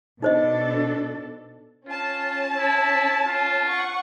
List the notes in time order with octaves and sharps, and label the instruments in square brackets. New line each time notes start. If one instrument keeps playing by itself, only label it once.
[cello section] B2 D4 A4 [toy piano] D#4 C5 D#5
[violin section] C#4 A5 [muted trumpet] F4
[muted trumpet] E4
F4
[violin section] F#5 C#6